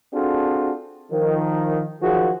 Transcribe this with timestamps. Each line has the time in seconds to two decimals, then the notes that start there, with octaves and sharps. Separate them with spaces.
0.13 C4 D4 F4 F#4 G#4 A4
1.12 D#3 F3
2.02 D#3 F3 F#3 F#4 G#4